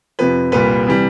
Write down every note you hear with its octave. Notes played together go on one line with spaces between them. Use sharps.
F2 C3 F3 B4
C2 A#2 G3 B4
C3 E3 G3